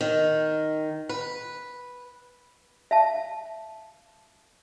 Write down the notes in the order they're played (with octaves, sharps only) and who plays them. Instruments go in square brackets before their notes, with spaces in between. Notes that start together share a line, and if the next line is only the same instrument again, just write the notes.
[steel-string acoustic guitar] D#3
B4
[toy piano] E5 F5 A5